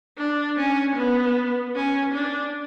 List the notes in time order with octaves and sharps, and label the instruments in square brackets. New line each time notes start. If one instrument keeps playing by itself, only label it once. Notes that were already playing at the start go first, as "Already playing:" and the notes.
[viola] D4
C#4
B3
C#4
D4